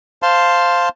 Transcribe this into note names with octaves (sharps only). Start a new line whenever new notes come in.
C5 F5 A5 C6